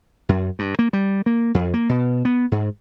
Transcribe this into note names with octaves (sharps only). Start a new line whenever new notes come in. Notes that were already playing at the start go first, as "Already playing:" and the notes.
F#2
G2
A#3
G3
A#3
F2
A#3
B2
B3
G#2